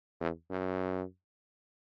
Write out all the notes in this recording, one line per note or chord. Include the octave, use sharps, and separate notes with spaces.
E2
F#2